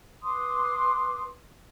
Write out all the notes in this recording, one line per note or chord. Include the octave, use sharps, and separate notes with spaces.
B4 C6 D6 D#6